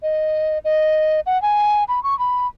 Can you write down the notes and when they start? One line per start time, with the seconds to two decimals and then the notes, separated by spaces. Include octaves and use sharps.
0.03 D#5
0.65 D#5
1.26 F#5
1.42 G#5
1.88 B5
2.04 C#6
2.19 B5